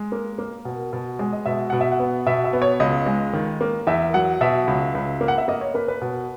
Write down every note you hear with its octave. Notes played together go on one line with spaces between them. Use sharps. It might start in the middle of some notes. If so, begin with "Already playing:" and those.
Already playing: G#3
A#3
A#3
B2
B2
G#3
D#5
B2 E5
B2 F#5
E5
F#5
B3
B2 E5
E5
B3
C#5
C#2 D#5
G#3
D#3
A#3
E2 E5
F#3 F#5
B2 E5
C#2
C#2
A#3
F#5
E5
A#3 D#5
C#5
A#3 B4
B4
B2